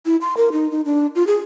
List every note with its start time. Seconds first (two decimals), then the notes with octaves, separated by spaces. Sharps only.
0.06 E4
0.21 C6
0.37 A#4
0.52 D#4
0.71 D#4
0.85 D4
1.15 F4
1.27 G#4